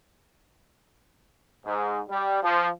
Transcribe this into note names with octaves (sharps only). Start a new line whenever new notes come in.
G#2
G3
F3